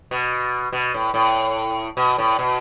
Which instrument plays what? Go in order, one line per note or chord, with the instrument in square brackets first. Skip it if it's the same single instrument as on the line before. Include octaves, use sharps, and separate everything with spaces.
[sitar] B2
B2
A2
A2
B2
A2
B2